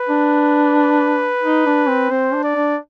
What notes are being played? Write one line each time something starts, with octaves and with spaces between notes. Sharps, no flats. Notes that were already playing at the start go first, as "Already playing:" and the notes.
Already playing: B4
D4
D#4
D4
C4
C4 C5
D4
D5
D4